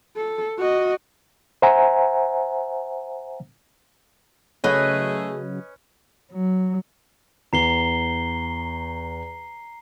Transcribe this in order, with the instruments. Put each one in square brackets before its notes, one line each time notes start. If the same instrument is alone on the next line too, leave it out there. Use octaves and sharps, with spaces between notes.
[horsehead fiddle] A4
F#4 D#5
[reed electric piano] C5 E5 F#5 G#5 A#5
[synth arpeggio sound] C#3 F#3 [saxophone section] A3 G#4 [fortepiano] C#4 [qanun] B4 D#5
[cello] F#3
[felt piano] E2 [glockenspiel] A#5 C7 G7